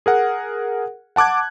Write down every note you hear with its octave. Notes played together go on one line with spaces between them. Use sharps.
G#4 A#4 F#5
F#5 A5 D6 F#6 G#6